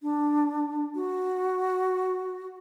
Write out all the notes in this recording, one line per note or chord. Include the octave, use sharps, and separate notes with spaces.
D4
F#4